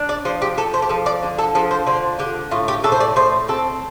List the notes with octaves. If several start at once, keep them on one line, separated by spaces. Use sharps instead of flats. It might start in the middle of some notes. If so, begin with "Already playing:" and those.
Already playing: D4
D5
F3 C5
G4
F3 A4
C5
G4
F3 A4
D5
D3
A4
F3 A4
C5
D3 C5
D3 G4
A2 F4
G4
A2 A4
C5
D5
A2 C5
C4 A4